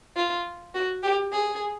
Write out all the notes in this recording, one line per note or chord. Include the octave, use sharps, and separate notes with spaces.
F4
F#4
G4
G#4